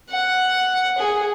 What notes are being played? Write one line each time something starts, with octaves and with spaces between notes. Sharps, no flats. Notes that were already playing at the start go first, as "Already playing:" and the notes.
F#5
G#4